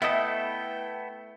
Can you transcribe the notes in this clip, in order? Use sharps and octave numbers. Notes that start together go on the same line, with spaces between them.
A3 B3 E4 A4 D#5 E5 G5